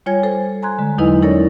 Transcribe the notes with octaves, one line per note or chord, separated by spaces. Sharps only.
G3 F4 C#5 G#5 G#6
A4 C5
G#5 A#5 C6 F#6 G#6
D3 G#3
E2 F#3 D#4 E4 B4 D#5
C#4 E4 A4 A#4 C#5 D5